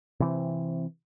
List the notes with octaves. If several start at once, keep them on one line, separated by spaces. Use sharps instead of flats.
C3 E3 C4